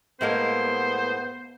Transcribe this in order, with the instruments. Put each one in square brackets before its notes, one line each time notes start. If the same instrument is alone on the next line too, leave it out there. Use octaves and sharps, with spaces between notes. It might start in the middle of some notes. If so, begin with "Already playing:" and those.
[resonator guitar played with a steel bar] A2 G#3 A#3 [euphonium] B3 [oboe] C5